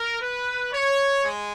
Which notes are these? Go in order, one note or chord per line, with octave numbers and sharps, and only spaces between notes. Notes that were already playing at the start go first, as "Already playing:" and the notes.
Already playing: A#4
B4
C#5
G#3